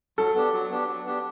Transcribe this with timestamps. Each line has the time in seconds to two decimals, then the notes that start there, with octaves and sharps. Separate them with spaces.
0.18 F#3 A4
0.35 B3 D4 G4
0.53 F#3
0.70 B3 D4 G4
0.88 F#3
1.05 B3 D4 G4